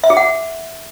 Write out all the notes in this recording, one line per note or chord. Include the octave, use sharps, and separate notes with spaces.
E5
G#4
F#5